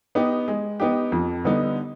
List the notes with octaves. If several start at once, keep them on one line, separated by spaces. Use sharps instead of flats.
B3 D#4 G4
G#3
B3 D#4 G4
F2
D3 G3 B3 D#4